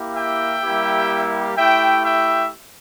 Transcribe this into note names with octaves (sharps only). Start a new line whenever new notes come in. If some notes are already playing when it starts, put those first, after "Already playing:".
Already playing: A#3 E4 G4
E5 G5
G3 A#3 E4 G4
A3 E4 G4 E5 G5
E5 G5